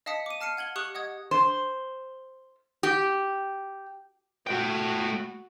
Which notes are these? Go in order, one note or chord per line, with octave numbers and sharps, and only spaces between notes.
D#5 F5 A5 D#6 B6 C#7
D6 D#7
A5 F6 C7 C#7 D#7
F#5 G#6 F#7 G7
G4 C#6 D#6 F#6 C#7 F#7
D#5 F#5 D#6 G#6
C5
G4
A3 F#4 G5